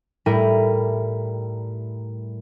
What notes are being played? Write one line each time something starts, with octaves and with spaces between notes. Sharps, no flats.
A2 G3 E4 A#4 D#7